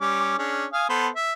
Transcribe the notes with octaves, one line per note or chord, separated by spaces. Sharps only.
G3 C#4 D6
C#4 D4 G#4
F5 G#5 D#6
B3 A4 C5
E5